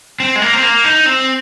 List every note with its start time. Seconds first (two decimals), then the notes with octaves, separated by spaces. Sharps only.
0.20 C4
0.36 G#3
0.42 A#3
0.53 C4
0.63 A#3
0.84 D#4
1.06 C4